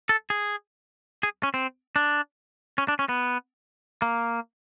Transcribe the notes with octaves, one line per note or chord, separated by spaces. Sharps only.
A4
G#4
G#4
C#4
C4
D4
C#4
D4
C#4
B3
A#3